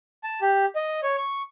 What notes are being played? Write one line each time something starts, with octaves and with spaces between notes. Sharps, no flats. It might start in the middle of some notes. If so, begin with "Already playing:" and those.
A5
G4
D#5
C#5
C#6